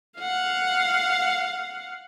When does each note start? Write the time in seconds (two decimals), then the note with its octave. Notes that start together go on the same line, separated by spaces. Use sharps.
0.18 F5 F#5